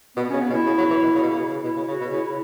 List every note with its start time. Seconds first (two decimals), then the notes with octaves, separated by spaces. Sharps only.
0.16 B2 B3
0.30 C#4
0.33 C#3
0.41 B3
0.50 B2
0.53 E4
0.66 C#3
0.78 F#3
0.90 E3
1.03 B2
1.15 C#3
1.22 B2
1.30 C#3
1.64 B2 E4
1.76 C#3
1.88 C#3 F#4
2.00 B2
2.12 C#3 E4
2.26 E4